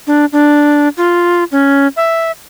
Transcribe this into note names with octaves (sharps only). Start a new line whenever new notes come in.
D4
D4
F4
C#4
E5